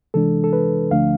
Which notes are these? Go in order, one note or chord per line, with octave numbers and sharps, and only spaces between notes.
C3 E3 G#3 D4 A4
A4
B4
D2 D3 F3 A3 D4 F5